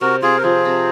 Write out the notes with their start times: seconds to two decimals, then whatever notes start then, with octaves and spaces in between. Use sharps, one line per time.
0.01 C3 F#4 A#4
0.22 C3 F4 G#4
0.38 A#4
0.43 F3 F4 G#4
0.65 C3